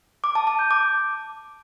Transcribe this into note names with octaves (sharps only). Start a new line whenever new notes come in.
D6
A5
A5
G6
D6